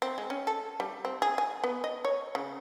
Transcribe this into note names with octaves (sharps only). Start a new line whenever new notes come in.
C4
G#3
C#4
A4
G3
C4
G#4
G#5
B3
D#5
C#5
C#3